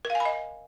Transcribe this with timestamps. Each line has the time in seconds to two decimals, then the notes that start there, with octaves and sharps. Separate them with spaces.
0.05 A#4
0.10 F5
0.15 G#5
0.20 B5
0.25 D#5